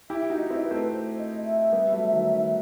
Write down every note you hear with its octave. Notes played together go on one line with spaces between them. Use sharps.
E4 G4 E5
D#4 F#4
D#5
C4 E4
B4
A3 C4
C5
D#5
E5
G3 B3
F#3 A3
D#3 F#3
D#3